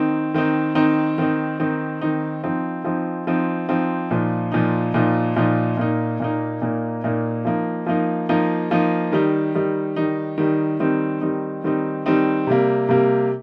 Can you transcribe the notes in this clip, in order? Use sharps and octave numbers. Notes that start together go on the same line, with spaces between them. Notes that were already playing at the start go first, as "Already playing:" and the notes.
Already playing: D#3 C4 D#4
D#3 C4 D#4
D#3 C4 D#4
D#3 C4 D#4
D#3 C4 D#4
D#3 C4 D#4
F3 C4 D#4
F3 C4 D#4
F3 C4 D#4
F3 C4 D#4
A#2 F3 D#4
A#2 F3 D#4
A#2 F3 D#4
A#2 F3 D#4
A#2 A#3 D#4
A#2 A#3 D#4
A#2 A#3 D#4
A#2 A#3 D#4
F3 A#3 D#4
F3 A#3 D#4
F3 A#3 D#4
F3 A#3 D#4
D#3 G3 D#4
D#3 G3 D#4
D#3 G3 D#4
D#3 G3 D#4
D#3 G3 C4 D#4
D#3 G3 C4 D#4
D#3 G3 C4 D#4
D#3 G3 C4 D#4
C3 G3 A#3
C3 G3 A#3